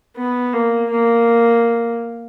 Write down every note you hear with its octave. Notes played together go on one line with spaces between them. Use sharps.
B3
A#3
A#3